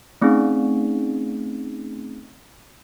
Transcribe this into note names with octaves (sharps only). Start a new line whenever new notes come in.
A3 C4 C#4 D#4 G#4